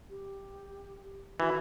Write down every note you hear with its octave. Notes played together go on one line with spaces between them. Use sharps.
G4
E3 F#4